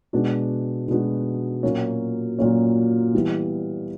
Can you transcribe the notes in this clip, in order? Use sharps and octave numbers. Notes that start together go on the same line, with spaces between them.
B2 G#3 B3 D4 F#4
B2 G#3 B3 D4 F#4
A#2 F#3 A#3 C#4
A#2 F#3 A#3 C#4
E3 G3 B3 E4